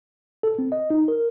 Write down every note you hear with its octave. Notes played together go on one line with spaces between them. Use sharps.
A4
C4
D#5
D#4
A#4